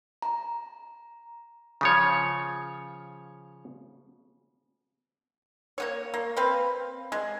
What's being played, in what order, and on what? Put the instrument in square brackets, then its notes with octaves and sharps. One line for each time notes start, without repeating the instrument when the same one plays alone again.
[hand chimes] A#5
[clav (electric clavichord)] C#3 F3 C#5
[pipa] A#3 B3 C#5
A#3
C4 B4 F5
G#3